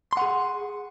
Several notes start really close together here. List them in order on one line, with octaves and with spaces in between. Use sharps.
C6 F#5 G#4